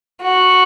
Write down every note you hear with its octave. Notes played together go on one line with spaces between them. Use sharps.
F#4